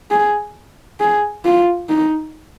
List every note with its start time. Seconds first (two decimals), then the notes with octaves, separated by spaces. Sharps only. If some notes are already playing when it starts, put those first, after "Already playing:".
0.11 G#4
1.00 G#4
1.45 F4
1.89 D#4